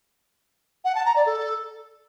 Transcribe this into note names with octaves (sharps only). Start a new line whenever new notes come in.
F#5
A5
A#5
D5
A4